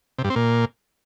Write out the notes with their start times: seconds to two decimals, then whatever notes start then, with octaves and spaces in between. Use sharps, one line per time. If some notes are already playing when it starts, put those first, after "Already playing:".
0.18 C3
0.24 G2
0.30 C4
0.36 A#2